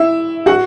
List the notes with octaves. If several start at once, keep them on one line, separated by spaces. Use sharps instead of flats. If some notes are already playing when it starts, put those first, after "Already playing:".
Already playing: E4 E5
F#4 F#5